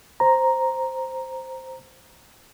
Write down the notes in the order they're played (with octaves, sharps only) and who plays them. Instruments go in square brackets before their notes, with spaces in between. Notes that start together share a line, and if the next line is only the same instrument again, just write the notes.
[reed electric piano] C5 A#5